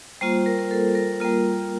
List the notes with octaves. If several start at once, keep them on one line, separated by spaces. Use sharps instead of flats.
G3 A#3 F4 C5
A#4
A#4
A4
A#4
G3 A#3 F4